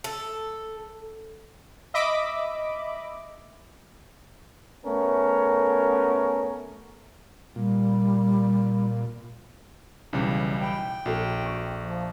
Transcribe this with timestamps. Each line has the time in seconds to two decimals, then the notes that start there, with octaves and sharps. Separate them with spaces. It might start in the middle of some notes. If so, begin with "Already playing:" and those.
0.04 A4
1.94 D#5 E5 B5 D6
4.85 A3 B3 C#4 A#4
7.56 A#2 G3
10.13 B1 C#3 E3 G3
10.61 G5 B5
11.06 A#1 F#4 A4
11.46 C#6
11.83 F3